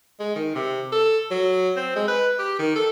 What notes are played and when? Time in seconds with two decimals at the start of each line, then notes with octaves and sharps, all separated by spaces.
0.20 G#3
0.36 D#3
0.55 C3
0.92 A4
1.31 F#3
1.76 C4
1.95 G#3
2.08 B4
2.39 G4
2.59 D#3
2.76 A4